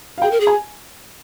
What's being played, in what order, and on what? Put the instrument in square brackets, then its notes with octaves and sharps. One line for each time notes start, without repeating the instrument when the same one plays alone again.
[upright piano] F5
[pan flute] G#4 [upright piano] G5
[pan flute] A#4
G#4
[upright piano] G#5